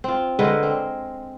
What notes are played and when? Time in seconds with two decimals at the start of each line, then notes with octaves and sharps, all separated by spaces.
0.04 C4 F4
0.39 D3 G#3 A#4 B4
0.63 C4